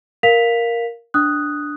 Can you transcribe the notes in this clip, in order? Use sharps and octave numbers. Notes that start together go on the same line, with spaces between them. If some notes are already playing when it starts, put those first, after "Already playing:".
A#4 F5 B6 F7
D4 D#6 F#6